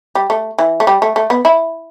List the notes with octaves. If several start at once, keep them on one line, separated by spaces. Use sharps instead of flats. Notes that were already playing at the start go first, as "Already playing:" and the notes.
G3
A3
E3
A3
G3
A3
A3
B3
E4